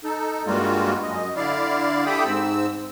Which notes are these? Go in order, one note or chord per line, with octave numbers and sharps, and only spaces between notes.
D#4 A4
G2 G3 G#3 A#3 F4 F#4
F#2 D#5
D3 E4 D5 F5
G4 A4 E5 G5 B5 D#6
G#2 C4 E6